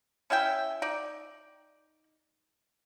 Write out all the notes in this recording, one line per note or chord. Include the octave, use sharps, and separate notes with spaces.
C#4 E4 E5 G5
D#4 D5